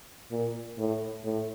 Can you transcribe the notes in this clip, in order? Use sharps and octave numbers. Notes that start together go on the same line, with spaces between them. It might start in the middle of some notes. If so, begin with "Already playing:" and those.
A#2
A2
A2